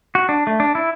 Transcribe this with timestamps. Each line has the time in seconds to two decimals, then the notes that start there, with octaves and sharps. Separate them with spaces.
0.15 F#4
0.29 D4
0.47 A3
0.60 D4
0.75 E4